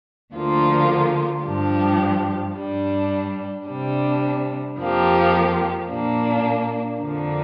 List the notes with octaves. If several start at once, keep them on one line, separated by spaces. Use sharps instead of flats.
D2 D3 F3 A#3 F4
G2 F3 D4 G4
G2 G3 D4
C3 G3 D4
F2 F3 A#3 G4
A#2 A#3 D4
F2 D3 F3 A#3 D4